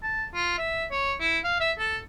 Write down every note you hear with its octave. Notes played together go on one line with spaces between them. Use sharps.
A5
F4
E5
C#5
E4
F5
E5
A4